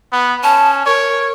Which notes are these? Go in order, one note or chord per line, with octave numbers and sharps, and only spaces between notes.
B3
C#4 A5
A#4 C#5